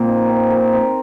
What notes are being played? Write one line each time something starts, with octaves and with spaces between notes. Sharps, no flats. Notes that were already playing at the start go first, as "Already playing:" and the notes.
Already playing: A#2 C4 A#4
D#4
C4
A#4
C4